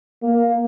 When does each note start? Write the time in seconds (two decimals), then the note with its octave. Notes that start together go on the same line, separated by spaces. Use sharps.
0.23 A#3